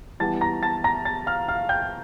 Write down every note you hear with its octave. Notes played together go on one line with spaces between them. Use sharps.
E3 G3 B3 A5 A6
A#5 A#6
A5 A6
A#5 A#6
A5 A6
F5 F6
F5 F6
G5 G6